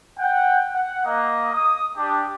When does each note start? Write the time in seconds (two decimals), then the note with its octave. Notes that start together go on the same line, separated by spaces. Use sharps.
0.19 F#5 G5
0.73 F#5
1.06 A#3 D#5
1.53 D#6
1.97 D4 G4